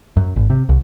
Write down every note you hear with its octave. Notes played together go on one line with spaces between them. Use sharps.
F#2
G#1
C3
C2